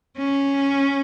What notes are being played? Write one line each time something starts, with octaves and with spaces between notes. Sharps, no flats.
C#4